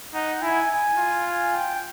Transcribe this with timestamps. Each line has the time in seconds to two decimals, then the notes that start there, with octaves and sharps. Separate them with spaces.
0.14 D#4 F#5
0.42 E4 G#5
0.71 G#5
0.98 F4
1.27 G#5
1.55 G5